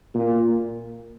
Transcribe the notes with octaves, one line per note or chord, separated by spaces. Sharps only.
A#2